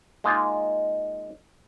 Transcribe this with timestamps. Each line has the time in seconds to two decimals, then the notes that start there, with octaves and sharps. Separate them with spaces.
0.24 G#3 A#3 D#4 F4